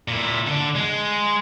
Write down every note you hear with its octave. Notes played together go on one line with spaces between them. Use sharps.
A#2 E4
D3 D4
G#3